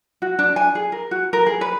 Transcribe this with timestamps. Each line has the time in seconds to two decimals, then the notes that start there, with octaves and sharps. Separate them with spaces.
0.22 F#4
0.39 D4
0.56 G#5
0.75 G#4
0.92 A#4
1.11 F#4
1.33 A#4
1.47 G#4
1.61 B4